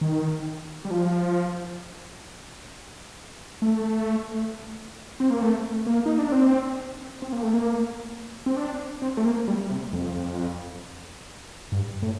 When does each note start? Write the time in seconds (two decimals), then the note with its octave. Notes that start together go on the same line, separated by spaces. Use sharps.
0.01 D#3
0.85 G3
0.91 F3
3.62 A3
5.20 C4
5.30 A#3
5.42 A3
5.86 A#3
6.06 D#4
6.19 D4
6.32 C4
7.22 C4
7.32 A#3
7.43 A3
7.54 A#3
8.46 C4
8.57 D4
9.02 C4
9.17 A3
9.25 A#3
9.48 G3
9.69 C3
9.93 F2
11.72 G2
12.02 A2